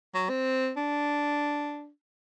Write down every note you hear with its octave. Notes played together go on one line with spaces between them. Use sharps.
F#3
C4
D4